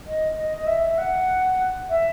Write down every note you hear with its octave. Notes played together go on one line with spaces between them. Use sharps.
D#5
D#5
D#5
E5
E5
F#5
E5